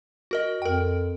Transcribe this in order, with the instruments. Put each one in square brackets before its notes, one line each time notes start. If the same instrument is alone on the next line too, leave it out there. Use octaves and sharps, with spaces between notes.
[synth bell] F#4 A#4 D#5
[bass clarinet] F2 [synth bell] A#4 G5